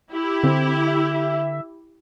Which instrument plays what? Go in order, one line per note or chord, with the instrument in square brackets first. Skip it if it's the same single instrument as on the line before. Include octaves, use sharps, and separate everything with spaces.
[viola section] E4 G4
[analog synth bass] D3 [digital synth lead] C4
[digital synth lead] E5